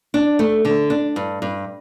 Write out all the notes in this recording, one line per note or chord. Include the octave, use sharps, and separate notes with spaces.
D4
A3
D3
D4
G2
G2